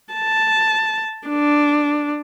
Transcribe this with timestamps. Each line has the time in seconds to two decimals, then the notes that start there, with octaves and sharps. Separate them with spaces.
0.14 A5
1.28 D4